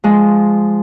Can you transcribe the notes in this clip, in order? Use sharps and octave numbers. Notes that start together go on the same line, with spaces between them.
F3 G#3